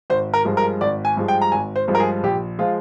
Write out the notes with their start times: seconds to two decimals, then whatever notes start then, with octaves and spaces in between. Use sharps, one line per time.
0.10 G#1 C5
0.34 A#4
0.45 G2 F3 G#3
0.57 A#4
0.81 G#1 D5
1.05 G#5
1.17 G2 F3 G#3
1.28 G5
1.41 A#5
1.52 G#1 G#5
1.76 C5
1.88 G2 F3 G#3
1.95 A#4
2.00 G#4
2.23 A#1 G4
2.59 F3 G#3 F4